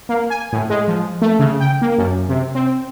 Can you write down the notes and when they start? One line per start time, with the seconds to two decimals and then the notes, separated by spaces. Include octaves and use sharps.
0.09 A#3
0.30 G#5
0.52 A2
0.70 G#3
0.88 F3
1.22 A3
1.39 C#3
1.60 G5
1.82 A#3
1.98 F#2
2.29 C3
2.55 C4